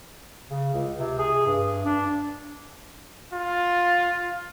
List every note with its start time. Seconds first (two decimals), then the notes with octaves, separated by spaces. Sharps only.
0.50 C#3
0.74 C#2
0.99 C3
1.19 G#4
1.47 G2
1.86 D4
3.33 F4